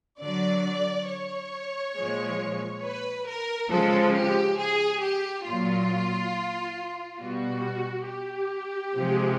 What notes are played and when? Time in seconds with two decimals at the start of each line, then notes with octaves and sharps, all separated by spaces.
0.21 D3 F#3 D5
1.08 C#5
1.96 A#2 F3 G#3
2.84 B4
3.27 A#4
3.70 C#3 F3 G#3 A4
4.14 G4
4.58 G#4
5.01 G4
5.45 A#2 F#3 F4
7.20 B2 G3 F#4
8.08 G4
8.95 C3 F3 G#3